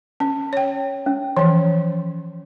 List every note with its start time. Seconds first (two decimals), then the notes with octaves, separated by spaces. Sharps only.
0.20 C#4
0.53 C#5 G5
1.06 C#4
1.37 E3 F3 C#5